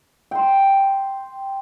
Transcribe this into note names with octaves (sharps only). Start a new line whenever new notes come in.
G5 C6